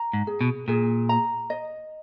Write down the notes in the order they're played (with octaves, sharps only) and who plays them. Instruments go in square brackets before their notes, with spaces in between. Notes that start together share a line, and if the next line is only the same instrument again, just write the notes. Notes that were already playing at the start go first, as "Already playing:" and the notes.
Already playing: [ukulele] A#5
[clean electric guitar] G#2
[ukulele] G#4
[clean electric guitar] B2
[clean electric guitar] A#2 [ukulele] G#4
[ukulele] A#5
D#5